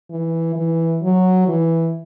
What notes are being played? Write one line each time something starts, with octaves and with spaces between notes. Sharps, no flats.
E3
E3
F#3
E3